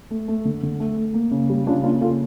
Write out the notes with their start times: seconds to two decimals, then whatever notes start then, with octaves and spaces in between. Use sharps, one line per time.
0.11 A3
0.28 A3
0.45 D3
0.63 D3
0.80 A3
0.97 A3
1.14 A#3
1.31 C#3
1.49 G3
1.67 C#3 D4 F4
1.83 A#3 D4 F4
2.01 C#3 F4 A4